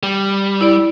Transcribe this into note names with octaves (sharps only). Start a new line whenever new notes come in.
G3
E4 D5